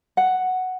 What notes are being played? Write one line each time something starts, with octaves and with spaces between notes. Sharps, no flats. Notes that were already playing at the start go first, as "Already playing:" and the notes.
F#5